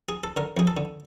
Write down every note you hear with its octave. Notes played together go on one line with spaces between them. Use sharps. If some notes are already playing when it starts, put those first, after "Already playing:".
G#4
A4
D3 A#4
F2 G#4
A4
D3